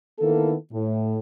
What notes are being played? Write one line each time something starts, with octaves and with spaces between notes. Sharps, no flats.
D#3 A#3 B3 E4 A4
A2